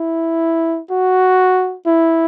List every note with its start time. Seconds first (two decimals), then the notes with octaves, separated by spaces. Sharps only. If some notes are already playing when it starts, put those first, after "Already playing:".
Already playing: E4
0.90 F#4
1.86 E4